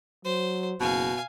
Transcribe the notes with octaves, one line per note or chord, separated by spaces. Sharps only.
F#3 C5
F#1 B2 F5 G#5